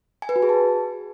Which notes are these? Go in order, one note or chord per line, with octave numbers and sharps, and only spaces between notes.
G#5
B4
F#4
G#4
A5